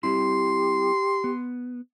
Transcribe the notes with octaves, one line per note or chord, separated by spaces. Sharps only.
G3 C4 E4 G4 C6
B3